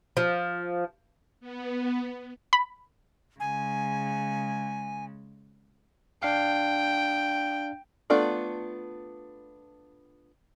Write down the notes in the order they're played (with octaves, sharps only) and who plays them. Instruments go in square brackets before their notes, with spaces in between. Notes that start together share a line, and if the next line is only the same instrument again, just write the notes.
[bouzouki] F3
[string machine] B3
[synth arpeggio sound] B5
[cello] C#3 G#3 [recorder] G#5
[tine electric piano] D4 F5 [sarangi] G5
[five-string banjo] A3 B3 D4 F4 D5